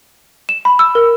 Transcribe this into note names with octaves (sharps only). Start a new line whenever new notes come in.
E7
B5
E6
A#4